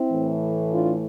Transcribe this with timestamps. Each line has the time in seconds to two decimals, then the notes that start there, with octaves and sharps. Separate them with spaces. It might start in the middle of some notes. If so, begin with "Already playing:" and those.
Already playing: C4 E4
0.11 A2 E3 A3
0.70 D4 F4